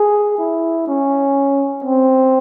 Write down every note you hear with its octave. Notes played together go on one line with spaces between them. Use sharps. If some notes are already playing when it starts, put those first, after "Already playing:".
Already playing: G#4
E4
C#4
C4